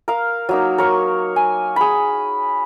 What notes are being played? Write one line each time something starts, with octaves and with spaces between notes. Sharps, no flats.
A#4 F5
F#3 A#3 D#4
A#4 C#5 C#6
G#5
G#4 B5